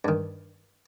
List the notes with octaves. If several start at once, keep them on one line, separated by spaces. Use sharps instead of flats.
G2 D#3